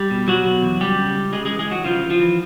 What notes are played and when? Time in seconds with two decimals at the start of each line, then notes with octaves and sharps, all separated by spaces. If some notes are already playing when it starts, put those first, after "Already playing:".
Already playing: G3 G4
0.11 B2
0.28 B2 F#3 F#4
0.45 B2
0.62 E2
0.80 C#2 G3 G4
0.98 C#3
1.15 C#2
1.32 C#3 G#3 G#4
1.45 G#3 G#4
1.50 E3
1.59 G#3 G#4
1.68 E3 F#3 F#4
1.84 C#3 F3 F4
2.02 E3
2.10 F3 F4
2.20 E3